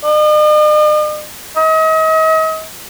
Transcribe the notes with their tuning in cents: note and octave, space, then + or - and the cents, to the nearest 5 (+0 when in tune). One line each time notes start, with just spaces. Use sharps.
D#5 -45
D#5 +40